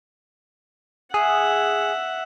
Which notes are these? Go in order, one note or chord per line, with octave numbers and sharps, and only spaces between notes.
G#4 E5 F#5